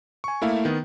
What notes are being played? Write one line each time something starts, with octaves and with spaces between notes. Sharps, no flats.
G#5 C#6
A3 A#3 E4 E5 F5
D#3 B3